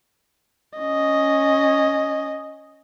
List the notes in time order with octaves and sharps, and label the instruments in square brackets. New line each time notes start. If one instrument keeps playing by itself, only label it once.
[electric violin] C#4 D#5